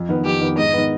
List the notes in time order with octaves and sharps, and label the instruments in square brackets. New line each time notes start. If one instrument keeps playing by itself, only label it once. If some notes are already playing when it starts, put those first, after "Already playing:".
Already playing: [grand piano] F2
D#3 B3
[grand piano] F2 [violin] G4
[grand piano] D#3 B3
[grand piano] G#2 [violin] D#5
[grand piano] D#3 B3